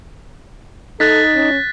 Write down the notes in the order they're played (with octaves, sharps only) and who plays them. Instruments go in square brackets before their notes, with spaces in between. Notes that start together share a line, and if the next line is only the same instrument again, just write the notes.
[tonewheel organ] D#4 [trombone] A4 [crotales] F#6 A6 B6
[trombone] C#4